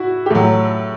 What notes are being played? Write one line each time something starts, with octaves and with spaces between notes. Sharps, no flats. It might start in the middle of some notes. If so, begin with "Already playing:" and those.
Already playing: E4 F#4
G4
A2 F#3 A4